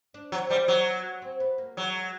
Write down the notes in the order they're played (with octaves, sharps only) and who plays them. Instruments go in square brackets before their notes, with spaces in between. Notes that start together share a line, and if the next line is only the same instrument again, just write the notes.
[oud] D4
[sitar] F#3 [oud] C4
[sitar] G3 [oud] C4
[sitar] F#3 [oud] B3
[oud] C4
B3
A#3
[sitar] F#3 [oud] G#3